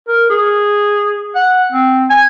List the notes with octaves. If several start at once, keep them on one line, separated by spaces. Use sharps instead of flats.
A#4
G#4
F#5
C4
G#5